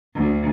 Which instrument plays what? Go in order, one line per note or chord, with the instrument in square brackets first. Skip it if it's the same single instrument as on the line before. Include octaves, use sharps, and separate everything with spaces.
[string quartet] D2